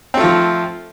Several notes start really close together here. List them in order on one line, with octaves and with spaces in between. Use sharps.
C4 A3 F4 F3